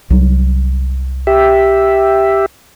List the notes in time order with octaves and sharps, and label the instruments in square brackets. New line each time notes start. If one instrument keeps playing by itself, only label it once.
[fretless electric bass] C2 F#3
[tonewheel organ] G4 E5